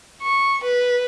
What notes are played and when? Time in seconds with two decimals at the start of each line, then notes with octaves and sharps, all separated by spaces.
0.22 C#6
0.63 B4